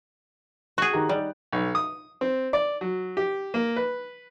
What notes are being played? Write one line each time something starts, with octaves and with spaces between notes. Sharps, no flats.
F#4 G#4 F#6
D#3 G4 A#5
G3 D#4 D5
B1
D#6
C4
D5
F#3
G4
A#3
B4